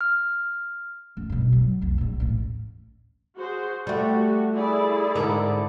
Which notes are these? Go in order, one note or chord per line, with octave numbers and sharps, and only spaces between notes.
F6
F#2
G2 B2
F#3
F1 C2
A#1 A#2
A1 D#2
F#4 G#4 C5
G3 A3 F#4 G4
E4 G#4 D5
G#2 D3 A#4